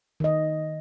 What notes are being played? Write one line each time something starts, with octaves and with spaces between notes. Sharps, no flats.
D#3 D#5